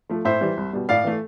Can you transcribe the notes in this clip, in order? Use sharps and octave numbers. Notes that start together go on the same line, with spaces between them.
F3 A3
A2 C5 E5
E3 G3
C2
B2 G3
A2 D5 F5
E3 A3